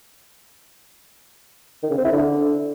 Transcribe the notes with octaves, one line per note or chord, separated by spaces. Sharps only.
D#3
C#3
C4
E4
D3